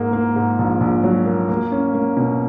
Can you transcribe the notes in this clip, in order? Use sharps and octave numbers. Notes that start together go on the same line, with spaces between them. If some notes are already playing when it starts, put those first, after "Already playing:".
Already playing: G#2 A#3
A#3
G#2
A#1
A#1
F#3
A#3
A#3
C#4
A#3
B2